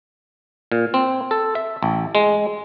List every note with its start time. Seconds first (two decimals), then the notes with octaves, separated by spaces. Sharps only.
0.72 A#2
0.94 C4
1.31 A4
1.55 E5
1.83 A1
2.15 G#3